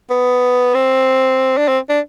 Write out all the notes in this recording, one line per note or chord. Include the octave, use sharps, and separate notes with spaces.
B3
C4
D4
C4
D4